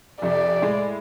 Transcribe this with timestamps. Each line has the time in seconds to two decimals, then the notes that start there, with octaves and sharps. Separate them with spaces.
0.22 F2 C3 D5
0.62 A2 G#3